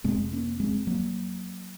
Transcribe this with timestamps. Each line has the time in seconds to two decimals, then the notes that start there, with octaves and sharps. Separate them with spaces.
0.04 F2 C3 G#3 C4
0.33 A#3 C#4
0.60 G#3 C4
0.87 F#3 A#3